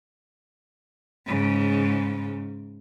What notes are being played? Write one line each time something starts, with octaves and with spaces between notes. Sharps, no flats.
G#2 C#3